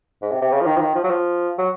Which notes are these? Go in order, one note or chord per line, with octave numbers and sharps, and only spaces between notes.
G#2
C3
C3
C#3
F3
D#3
F3
D#3
F3
F#3
F3
F#3